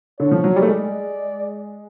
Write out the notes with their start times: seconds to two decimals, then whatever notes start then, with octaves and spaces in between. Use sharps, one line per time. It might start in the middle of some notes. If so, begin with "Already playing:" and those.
0.20 D3 C#5
0.31 F3
0.44 F#3
0.56 G3
0.62 A3
0.68 G#3 D5